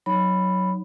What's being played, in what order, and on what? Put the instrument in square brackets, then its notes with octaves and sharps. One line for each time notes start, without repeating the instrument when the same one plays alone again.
[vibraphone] F#3 D#4 C#5 B5